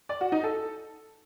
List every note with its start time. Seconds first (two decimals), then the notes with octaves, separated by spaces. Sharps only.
0.09 D5
0.21 F#4
0.32 D#4
0.43 A4